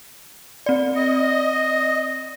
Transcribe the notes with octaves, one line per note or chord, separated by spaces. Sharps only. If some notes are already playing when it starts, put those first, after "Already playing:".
C4 D5
D#5